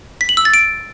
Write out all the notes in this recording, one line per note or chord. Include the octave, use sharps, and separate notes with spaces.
B6
F#7
E6
A6
D7